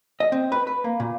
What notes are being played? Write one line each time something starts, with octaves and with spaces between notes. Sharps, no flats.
D#5
C4
B4
B4
A#3
A#2